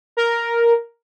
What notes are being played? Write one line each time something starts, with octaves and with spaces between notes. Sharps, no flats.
A#4